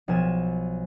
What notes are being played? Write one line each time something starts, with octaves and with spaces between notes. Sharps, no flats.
B1 F3 G#5 E7